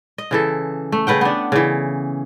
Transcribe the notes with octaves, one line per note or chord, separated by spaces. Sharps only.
D#5
C#3 E3 A4
A3
C#3 B4 F#5 G5
B3 D4
C#3 E3